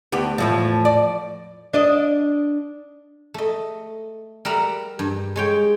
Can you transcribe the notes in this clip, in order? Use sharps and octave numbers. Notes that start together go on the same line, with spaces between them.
D2 B3 G4
E2 A2 F3
D5
D4 D5 D#5
A3 D#5
G3 A#4 E5 F#5 A#5
G2
G#3 C#5 G5